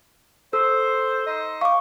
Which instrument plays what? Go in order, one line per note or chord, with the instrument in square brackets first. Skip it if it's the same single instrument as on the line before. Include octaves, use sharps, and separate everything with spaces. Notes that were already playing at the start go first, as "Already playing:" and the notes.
[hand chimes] A4 [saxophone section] C5 [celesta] E6
[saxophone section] D#4 C5 D#5
[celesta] F5 [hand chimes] C#6 D6